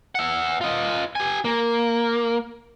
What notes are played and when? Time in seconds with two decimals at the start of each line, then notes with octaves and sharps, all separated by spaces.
0.15 E5 F#5
0.61 F4 D#5
1.15 G4 G#5
1.45 A#3